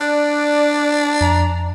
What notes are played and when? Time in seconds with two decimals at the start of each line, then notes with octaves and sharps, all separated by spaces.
0.01 D4 D5 F#6
1.21 F2 A#5